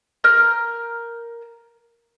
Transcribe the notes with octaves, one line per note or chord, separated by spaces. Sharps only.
A#4 F6 G6